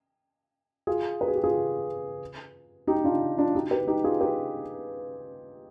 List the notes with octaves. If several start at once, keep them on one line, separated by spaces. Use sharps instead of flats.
F4 G#4
B4
G#4
G4
F4 G#4
D#4 G4
D4 F4
D4 F4
D#4 G4
G4 B4
D#4 G4
F4 G#4
G4 B4